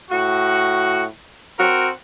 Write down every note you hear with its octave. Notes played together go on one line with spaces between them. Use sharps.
A2 F#4
C4 F#4 A#4